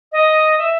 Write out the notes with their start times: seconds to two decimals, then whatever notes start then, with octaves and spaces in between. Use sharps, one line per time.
0.12 D#5
0.58 E5